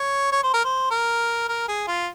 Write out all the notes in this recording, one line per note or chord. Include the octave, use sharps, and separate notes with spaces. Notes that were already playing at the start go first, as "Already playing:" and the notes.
Already playing: C#5
C#5
C5
A#4
C5
A#4
A#4
G#4
F4